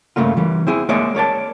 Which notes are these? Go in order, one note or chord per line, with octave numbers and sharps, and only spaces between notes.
G2 C#3 A3 A#3 F4
E3 G3
C4 E4 G#4
G#3 A#3 G#4 C#5 D5 E5
A#4 C#5 D5 A5